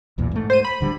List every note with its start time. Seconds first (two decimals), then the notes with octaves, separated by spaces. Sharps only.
0.18 B1 E2 A#2
0.31 G#2 A3
0.50 C5 D#7
0.65 B5
0.81 D1 D3 G3